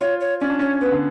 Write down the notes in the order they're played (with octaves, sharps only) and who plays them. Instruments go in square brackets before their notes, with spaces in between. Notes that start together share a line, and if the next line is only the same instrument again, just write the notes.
[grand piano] F4 [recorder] C#5
[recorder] C#5
[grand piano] C#4 [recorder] D5
[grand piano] D4
[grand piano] C#4 [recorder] C#5
[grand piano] B3 [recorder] B4
[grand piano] D3